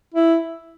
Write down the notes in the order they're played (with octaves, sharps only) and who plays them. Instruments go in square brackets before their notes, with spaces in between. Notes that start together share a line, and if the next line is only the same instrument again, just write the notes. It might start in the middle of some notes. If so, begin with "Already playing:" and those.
[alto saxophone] E4